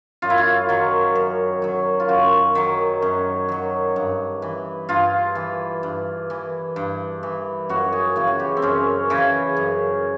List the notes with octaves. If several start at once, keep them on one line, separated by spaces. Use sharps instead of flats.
F#2 F4
E4
F4
D#3 F#3
F#2
D#3 F#3
F4
F#2 F#4
D#3 F#3
F#2
D#3 F#3
G2
E3
G2 F4
E3
G2
E3
G2
E3
F#2 F#4
G#4
C#3 E3
F#4
G4
C4
F#2 C#4
C#3 E3
F#2